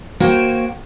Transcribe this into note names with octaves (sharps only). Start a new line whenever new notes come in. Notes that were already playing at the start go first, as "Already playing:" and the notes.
A#3 F#4 C5 C#5 G5